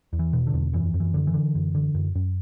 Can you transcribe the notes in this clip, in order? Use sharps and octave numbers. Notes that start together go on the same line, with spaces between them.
E2
E3
B2
D3
E2
F#2 E3
F#2
E3
D3
E3
D3
F#2
D3
F#2
F#2